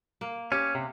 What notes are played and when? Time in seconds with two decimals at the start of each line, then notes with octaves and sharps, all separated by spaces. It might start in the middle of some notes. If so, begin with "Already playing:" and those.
0.21 A#3
0.52 C#4 G4
0.75 C3